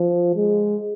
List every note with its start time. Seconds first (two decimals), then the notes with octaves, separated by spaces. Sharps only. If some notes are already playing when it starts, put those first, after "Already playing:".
Already playing: F3
0.36 G#3